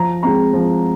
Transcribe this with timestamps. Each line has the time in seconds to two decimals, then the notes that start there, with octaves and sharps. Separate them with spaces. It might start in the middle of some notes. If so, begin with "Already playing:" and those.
Already playing: F3 A#5
0.23 G#3 C4 A#5
0.53 F3